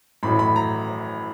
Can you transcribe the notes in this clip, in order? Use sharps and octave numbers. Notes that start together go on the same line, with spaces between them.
A1 A2 F#3 B5
B5
A#5